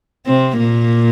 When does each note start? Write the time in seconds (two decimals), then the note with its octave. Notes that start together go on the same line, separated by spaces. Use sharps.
0.26 C3 C4
0.59 A#2 A#3